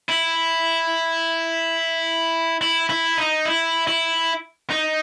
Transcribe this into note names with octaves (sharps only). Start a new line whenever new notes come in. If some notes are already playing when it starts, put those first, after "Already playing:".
E4
E4
E4
D#4
E4
E4
D#4